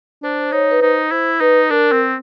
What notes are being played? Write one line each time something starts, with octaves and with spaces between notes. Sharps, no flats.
D4 C5
C5
D#4 C#5
B4
D#4 C5
E4 C5
D#4 B4
D4 A#4
C4